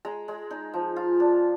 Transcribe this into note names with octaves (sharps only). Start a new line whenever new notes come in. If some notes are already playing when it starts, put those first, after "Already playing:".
G#3 A#5
G#3
D#4
F3
F4
D4